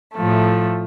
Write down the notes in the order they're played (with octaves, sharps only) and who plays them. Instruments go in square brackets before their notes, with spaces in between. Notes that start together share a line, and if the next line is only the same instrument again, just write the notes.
[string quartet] A2 F3 A3